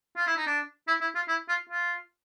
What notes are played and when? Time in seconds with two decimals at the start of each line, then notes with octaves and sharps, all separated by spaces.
0.17 F4
0.27 E4
0.37 D#4
0.46 D4
0.88 E4
1.01 E4
1.15 F4
1.28 E4
1.49 F4
1.69 F4